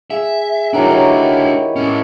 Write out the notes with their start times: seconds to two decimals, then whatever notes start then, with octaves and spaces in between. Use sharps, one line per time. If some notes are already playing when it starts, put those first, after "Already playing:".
0.10 G#4 E5
0.73 D#3 F#3 D4 E4 F#4
0.91 G4 B4 C#5
1.76 A2 C#4